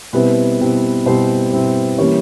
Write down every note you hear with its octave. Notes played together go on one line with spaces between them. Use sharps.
B2 G3 C4 E4 B4
B2 G3 C4 E4
B2 G3 C4 E4 C5
B2 G3 C4 E4
E3 G3 A#3 C#4 C#5